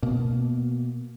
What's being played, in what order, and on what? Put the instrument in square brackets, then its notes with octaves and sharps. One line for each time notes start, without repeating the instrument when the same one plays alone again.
[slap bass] B2 A#3